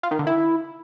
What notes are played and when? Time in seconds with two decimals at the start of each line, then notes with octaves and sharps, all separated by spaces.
0.03 F4
0.11 D#3
0.19 D3
0.27 E4